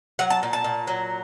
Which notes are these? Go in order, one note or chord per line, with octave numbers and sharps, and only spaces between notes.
F#3 F#5
A5
A#2
A5
A#2
F#3